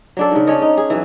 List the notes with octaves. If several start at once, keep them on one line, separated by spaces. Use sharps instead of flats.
F#3 D4 A4
G#2 C#3
C#4 D4 C#5 D#5
D#4
G#4
E3 F#3